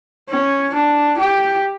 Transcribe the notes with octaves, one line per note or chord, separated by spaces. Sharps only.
C#4
D4
G4